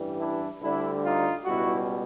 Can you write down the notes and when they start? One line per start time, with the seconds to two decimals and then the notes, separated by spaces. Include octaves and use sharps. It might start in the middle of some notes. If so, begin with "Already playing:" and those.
Already playing: A1 G2 E3 G3
0.20 D4 E4
0.61 D2 D3 G3 D4 E4
1.03 D#4 F4
1.44 C#2 B2 G3 E4 F#4